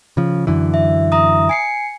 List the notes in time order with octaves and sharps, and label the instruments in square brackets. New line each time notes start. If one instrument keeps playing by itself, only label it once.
[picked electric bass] C#3 F3
F#2 D3 E3
[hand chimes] E5
E5 A#5 D#6
G#5 C7 C#7